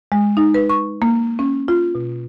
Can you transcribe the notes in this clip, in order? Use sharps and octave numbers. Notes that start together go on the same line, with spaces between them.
G#3
D#4
B4
C#6
A#3
C#4
F4
B2